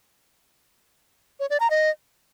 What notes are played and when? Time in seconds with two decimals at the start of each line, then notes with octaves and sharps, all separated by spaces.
1.40 C#5
1.50 D5
1.60 A#5
1.70 D#5